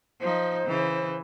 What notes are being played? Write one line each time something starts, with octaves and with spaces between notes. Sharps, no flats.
F3 D#4 C5
C#3 E3